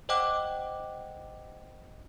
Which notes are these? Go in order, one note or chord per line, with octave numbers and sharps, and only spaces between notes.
C5 D#5 F#5 G5 D6 F#6